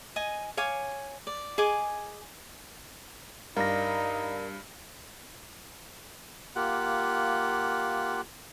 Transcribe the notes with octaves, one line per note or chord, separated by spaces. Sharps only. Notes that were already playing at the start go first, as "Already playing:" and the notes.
D#5 G#5
C#5 F5 G#5 D6
D5
G#4 D#5 G#5 D6
G2 D#4 A#4 D5 F5 A#6
A#3 F4 G4 F#5